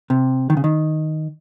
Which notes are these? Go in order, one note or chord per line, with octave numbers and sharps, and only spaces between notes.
C3
D#3
C#3
D#3